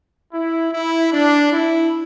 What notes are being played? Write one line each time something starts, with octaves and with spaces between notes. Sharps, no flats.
E4
E4
D4
E4